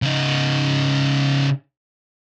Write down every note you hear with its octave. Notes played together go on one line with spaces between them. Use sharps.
C#3 D#4